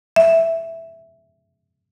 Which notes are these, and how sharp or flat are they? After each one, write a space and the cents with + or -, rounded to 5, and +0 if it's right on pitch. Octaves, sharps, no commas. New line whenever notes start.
E5 +0